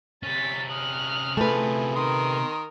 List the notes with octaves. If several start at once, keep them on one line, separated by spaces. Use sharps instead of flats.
C3 C#4 A6 B6
D#6 F6 F#6
F3 A3 E4 G#4 B4
D#3 A#4 C6 D#6